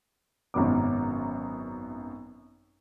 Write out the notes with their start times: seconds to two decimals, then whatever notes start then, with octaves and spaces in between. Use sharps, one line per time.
0.54 G#1 F#2 B2 B3 D6